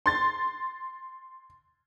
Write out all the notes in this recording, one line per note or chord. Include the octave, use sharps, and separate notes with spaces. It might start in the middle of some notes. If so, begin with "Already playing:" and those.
C6 A6